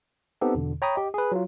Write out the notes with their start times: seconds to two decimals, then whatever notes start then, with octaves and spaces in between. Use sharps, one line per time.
0.41 B3 C4 D#4 G4 A4
0.55 E2 B2 D3
0.82 C#5 G5 A#5 B5 C#6 D#6
0.96 G4 D#5
1.14 G#4 B4
1.32 F#3 F4